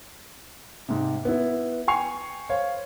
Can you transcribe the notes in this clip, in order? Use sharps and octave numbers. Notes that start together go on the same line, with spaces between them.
G#2 C3
B3 E4
G5 G#5 C#6 C7 F7
C5 C#5 F5